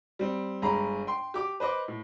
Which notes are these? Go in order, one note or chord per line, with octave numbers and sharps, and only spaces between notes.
G3 C4
G1 G#3 A#5 B5
G5 C6
G4 D6
B4 C5 D#5 D6
A2